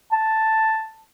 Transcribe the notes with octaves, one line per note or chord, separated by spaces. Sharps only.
A5